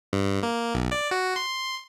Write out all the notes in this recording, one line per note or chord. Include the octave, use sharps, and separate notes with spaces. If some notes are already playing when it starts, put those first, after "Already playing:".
G2
A#3
B1
D5
F#4
C6